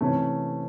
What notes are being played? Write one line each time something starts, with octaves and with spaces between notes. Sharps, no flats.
C3 E3 A3 C#4